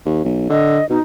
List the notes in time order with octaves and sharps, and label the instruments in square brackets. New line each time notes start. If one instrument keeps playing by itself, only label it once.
[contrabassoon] D#2
B1
[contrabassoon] D3 [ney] D#5
[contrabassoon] B2 [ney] D#4